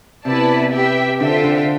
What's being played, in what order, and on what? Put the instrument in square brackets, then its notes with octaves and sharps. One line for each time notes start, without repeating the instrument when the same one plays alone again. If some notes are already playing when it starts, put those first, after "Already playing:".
[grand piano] C3 [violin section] B3 E4 B4 D5 A5
[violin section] G4 B4 E5 G5
[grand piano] D3 [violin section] F4 A4 C5 E5 G5
[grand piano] D3